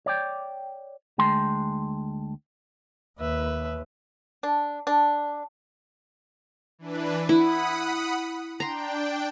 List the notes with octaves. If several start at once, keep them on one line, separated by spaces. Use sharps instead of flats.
C#5 D5 G5
D2 G#3 G5 A5 C6
D#2 B4 E5
D4
D4
E3 D4 B4
E4 F#5 B5 D#6
D4 G5 A#5 C6